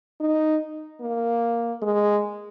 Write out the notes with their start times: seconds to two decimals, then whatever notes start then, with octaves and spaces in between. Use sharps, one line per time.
0.21 D#4
1.01 A#3
1.82 G#3